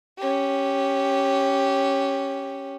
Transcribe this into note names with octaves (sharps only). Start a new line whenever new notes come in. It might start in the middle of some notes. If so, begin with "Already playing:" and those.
C#4 G4